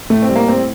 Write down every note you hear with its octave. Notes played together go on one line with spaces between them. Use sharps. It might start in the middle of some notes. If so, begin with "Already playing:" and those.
A2 A3
C4
G3
A#3
A2 C4